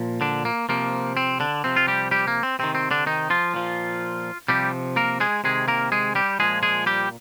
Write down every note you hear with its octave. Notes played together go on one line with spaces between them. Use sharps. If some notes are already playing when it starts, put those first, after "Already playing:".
Already playing: A#2 F3
D3 D4
A#3
C3 F3 A#3
C4
D3 D4
C3 F3 C4
F4
G3 G4
G3 G4
A#3
C4
C3 D#3 C4
C4
D3 D4
D#3 D#4
F3 F4
A#2 F3
C3 F3 G3 G4
A#3 A#4
G#3 G#4
C3 D#3 G#3 G#4
A#3 A#4
G#3 G#4
G3 G4
A#2 F3 G#3 G#4
G#3 G#4
G3 G4